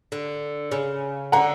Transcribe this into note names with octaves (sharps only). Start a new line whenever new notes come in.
D3
C#3
D3 F#5 A#5